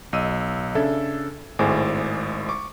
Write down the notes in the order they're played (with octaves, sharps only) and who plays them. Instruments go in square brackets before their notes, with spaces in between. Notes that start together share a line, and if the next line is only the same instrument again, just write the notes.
[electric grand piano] B1 D#5 E6 D#7
C#3 D4 A4 E5 G#6
G#1 A2 G#3 C5 G#5 D6
C#6 D6